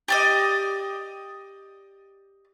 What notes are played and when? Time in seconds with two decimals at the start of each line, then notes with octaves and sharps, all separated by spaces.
0.08 G4 D5 D#5